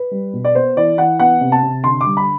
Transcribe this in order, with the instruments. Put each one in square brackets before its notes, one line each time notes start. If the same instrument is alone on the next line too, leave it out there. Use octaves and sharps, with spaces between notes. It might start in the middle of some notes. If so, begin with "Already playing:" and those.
Already playing: [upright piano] B4
G3
B2
D5
B3 C5
E3 D5
E3 F#5
B3 F#5
C3
A5
C3
D3 C6
D6
G3
B5